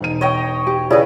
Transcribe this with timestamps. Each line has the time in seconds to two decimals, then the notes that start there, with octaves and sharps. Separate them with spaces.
0.01 E1 D#4 D#7
0.21 C#5 D#5 G5
0.67 G4
0.90 C#3 E4 G#4 B4 D5 D#5